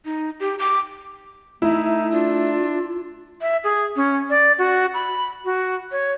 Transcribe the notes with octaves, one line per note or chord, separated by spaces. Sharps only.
D#4
G4
D6
A3 D#4 E4
D4 F4
E5
G#4
C#4
D5
F#4
B5
F#4
C#5